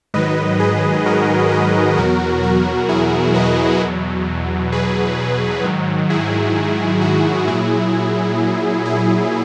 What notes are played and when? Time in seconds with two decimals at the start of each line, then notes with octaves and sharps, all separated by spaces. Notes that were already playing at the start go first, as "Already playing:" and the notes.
0.14 G#2 D#3 F#3 B4 D#5
0.60 G#4 B4
1.05 F#4 A#4
1.51 G#4 B4
1.97 E2 B2 F#3 F#4 A#4
2.43 F#4 A#4
2.89 E4 G#4
3.34 B4 D#5
3.81 E2 B2 F#3
4.72 G#4 B4
5.64 G#2 D#3 F#3
6.10 E4 G#4
7.01 F#4
7.47 A#2 F#3 E4 G#4
8.85 E4 G#4